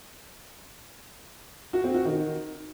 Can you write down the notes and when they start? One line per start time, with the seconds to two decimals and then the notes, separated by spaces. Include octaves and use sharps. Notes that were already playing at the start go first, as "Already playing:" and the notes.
1.73 F#4
1.84 C4
1.95 F#4
2.05 D#3